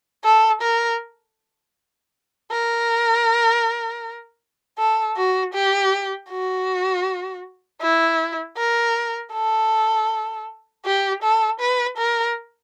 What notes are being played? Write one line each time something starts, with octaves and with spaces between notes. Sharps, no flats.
A4
A#4
A#4
A4
F#4
G4
F#4
E4
A#4
A4
G4
A4
B4
A#4